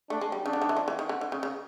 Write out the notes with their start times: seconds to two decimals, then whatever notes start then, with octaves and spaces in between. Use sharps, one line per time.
0.10 A3 D4
0.21 G#3
0.32 G3
0.44 C#3 D4
0.53 D3
0.62 D#3
0.69 E3
0.77 F3
0.88 E3
0.99 D#3
1.09 D3
1.21 D3
1.32 C#3
1.43 C#3